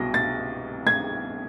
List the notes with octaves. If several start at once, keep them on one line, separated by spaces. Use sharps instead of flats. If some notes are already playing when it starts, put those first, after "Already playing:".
Already playing: C2 B2 F#3 A#6
A6
G#6